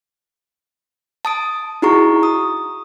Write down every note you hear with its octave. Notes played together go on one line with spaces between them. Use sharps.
A5 D#6 D7
D#4 E4 F#4 G#4 A#5 C#6
D#6